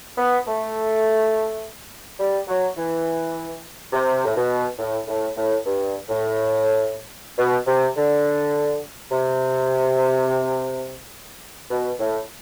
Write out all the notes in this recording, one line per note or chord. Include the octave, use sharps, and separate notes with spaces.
B3
A3
G3
F#3
E3
C3
A2
B2
A2
A2
A2
G2
A2
B2
C3
D3
C3
B2
A2